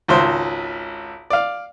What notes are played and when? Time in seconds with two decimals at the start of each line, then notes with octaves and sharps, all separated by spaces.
0.08 G#1 C#2 C5
1.30 D5 F5